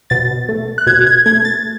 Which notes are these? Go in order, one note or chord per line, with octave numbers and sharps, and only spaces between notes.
B2 A6
A3
F#6
B2 G#6
G#6
A3 G#6
A6